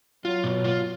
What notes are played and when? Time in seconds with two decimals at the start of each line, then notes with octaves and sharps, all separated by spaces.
0.24 F#3 F4
0.44 B2
0.64 F4